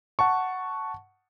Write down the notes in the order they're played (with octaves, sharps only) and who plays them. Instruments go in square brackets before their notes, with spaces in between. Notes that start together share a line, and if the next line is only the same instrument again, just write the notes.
[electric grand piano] F#5 A5 C#6